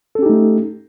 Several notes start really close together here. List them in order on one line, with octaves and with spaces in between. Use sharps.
A4 C#4 G4 D#4 A3